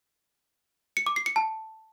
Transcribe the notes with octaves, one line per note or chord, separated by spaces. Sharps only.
C#7
D6
C7
C#7
A5